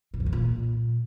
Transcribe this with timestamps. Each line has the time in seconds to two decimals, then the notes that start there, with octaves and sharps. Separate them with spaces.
0.14 A#2
0.20 F#2
0.26 E2
0.33 A#2